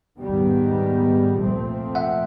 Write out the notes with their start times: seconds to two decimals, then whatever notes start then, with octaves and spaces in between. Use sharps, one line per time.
0.18 G#2 D#3 G3 B3
1.36 A#2 F3 A3 C4
1.95 E5 F#5